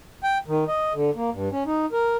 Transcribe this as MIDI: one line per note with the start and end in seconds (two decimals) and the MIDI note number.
0.24 0.38 79
0.48 0.64 51
0.68 0.93 75
0.94 1.11 50
1.16 1.30 58
1.32 1.49 43
1.52 1.64 61
1.66 1.86 63
1.92 2.17 70